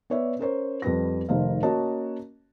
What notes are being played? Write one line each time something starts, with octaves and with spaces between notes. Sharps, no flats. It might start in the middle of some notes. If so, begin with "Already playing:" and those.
B3 B4 C#5 D5 E5
C#4 A#4 C5 C#5
F2 G3 C4 B4 A#6
F1 D#3 C5 F5
A#3 C#4 F#4 C#5 D#5 A5